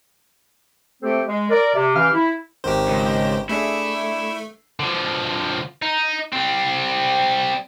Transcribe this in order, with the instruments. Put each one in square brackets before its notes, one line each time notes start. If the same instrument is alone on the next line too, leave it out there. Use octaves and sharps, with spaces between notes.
[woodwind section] A3 C4 G4 A4 C5
G#3
A#4 D5
C3
E3 C#4 G4 F5 F6
E4
[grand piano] G#1 D#3 [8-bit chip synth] G4 C5
[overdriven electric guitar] C#2
[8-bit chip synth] A3 [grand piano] D4 G#4 A4 [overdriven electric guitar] E4
[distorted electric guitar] D3 F3
D#4
G3 C4